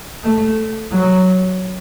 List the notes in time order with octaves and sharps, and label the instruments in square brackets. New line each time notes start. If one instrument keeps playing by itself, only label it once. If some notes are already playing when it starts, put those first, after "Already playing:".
[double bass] A3
F#3